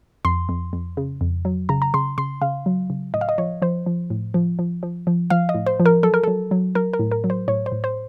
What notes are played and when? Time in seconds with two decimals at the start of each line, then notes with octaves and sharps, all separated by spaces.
0.25 F2 C6
0.49 F2
0.73 F2
0.97 C#3
1.21 F2
1.45 F#3
1.69 C#3 A#5
1.82 A#5
1.94 C#3 C6
2.18 C#3 C6
2.41 C#3 F5
2.66 F#3
2.90 C#3
3.14 A2 D#5
3.21 F5
3.29 D#5
3.38 F3 C#5
3.62 F3 C5
3.86 F3
4.10 A2
4.34 F3
4.59 F3
4.83 F3
5.07 F3
5.30 F3 F5
5.49 D#5
5.54 A2
5.66 C5
5.80 F3
5.86 A#4
6.03 F#3 A4
6.14 A#4
6.23 F#3 A4
6.51 F#3
6.75 F#3 A#4
6.93 A#4
6.99 A2
7.11 A#4
7.24 F#3
7.30 C5
7.48 A2 C#5
7.66 C5
7.72 A2
7.84 C5